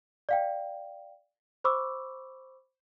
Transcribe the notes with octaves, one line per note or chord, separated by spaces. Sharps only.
D5 F5 G5
C5 B5 C#6 D6 E6